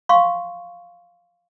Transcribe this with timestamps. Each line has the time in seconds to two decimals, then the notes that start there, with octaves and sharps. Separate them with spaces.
0.09 F5 C6 C#6